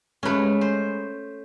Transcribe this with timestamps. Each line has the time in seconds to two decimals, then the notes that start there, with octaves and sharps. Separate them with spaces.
0.23 G#3 A3 C#4 B4
0.61 C5